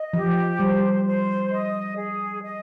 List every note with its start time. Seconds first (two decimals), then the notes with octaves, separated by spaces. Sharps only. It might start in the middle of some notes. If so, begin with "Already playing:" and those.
Already playing: D#5
0.13 F3 G4
0.59 G3 C5
1.05 C5
1.50 D#5
1.96 G#4
2.43 D#5